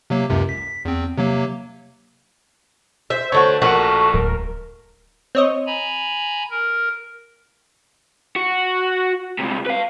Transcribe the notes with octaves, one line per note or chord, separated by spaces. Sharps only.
C3 F#3 A#3
C#2 F#2 C3
B6
E2 C4
C3 F#3 A#3
C5 E5
D3 A3 F#4 C#5
A#1 A3 F#4 A#4 F#5
D1 A2 A#4
C4 C#5 D#5
G#5 A#5 B5
A#4
F#4
C#2 C3
B4 F5